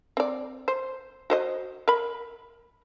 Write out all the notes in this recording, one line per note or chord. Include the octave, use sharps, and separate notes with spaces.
C4 D5
C5
F#4 C5 D#5
A#4 B5